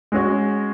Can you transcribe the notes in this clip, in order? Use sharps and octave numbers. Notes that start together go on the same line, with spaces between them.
G#3 C#4 F#4